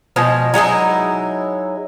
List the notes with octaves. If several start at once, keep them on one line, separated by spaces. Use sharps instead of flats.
B2 F3 G#3
F#3 G#3 D#4 E4